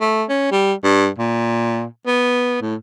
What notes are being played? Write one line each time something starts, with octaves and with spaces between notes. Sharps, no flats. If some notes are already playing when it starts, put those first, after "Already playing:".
A3
C#4
G3
G2
A#2
B3
A2